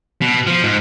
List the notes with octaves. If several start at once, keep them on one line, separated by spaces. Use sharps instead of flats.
B2
F3
G#2